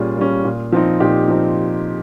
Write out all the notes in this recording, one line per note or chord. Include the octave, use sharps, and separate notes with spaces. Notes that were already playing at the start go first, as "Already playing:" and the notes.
Already playing: A#2 G3 C#4 F4 G#4
G3 C#4
A#2
F3 C4 D#4
A#2 D#4 G4
F3 C4 D#4